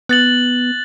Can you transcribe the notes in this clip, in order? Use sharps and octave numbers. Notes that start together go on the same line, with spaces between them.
B3 F#6 A6 F#7